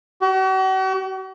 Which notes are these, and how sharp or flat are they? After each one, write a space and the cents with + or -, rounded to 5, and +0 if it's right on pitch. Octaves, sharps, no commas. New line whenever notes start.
F#4 +45